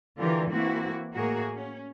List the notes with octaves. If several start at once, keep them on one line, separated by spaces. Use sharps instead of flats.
D3 E3 F4 G4 A#4
E3 A#3 C4 E4 F#4
A2 A#3 F#4 G#4 A#4
C#4